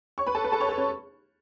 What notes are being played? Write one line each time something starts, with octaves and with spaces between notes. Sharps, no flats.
C#5 C#6
B4 B5
A4 A5
B4 B5
A4 A5
C#5 C#6
A4 A5
C#4 C#5